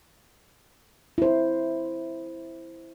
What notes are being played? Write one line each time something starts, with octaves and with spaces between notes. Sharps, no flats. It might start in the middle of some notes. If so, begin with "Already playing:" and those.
E4 C5